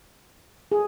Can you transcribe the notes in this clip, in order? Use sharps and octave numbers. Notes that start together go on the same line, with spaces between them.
G#4